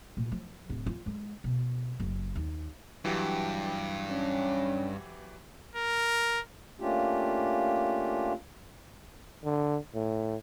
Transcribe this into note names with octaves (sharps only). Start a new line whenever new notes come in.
A#2
F3
D1
F4
G#3
B2
F#1
D#2
G2 E3 F#3 G4
C#4 D4
A#4
A3 A#3 C#4 D4 F4 G4
D3
A2